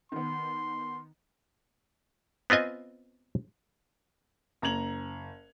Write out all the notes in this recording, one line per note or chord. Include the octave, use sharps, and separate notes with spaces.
D#3 B3 C6
B3 C4 F4 D#5 G#5
F#1 A#5 G#6 F7 F#7